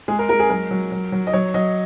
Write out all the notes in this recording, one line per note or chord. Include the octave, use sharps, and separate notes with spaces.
G#3 G#4
A#4
G#3 A#4
G#4
F#3 A#4
F#3
F#3
F#3
D#5
F#3 C#5
F#3 D#5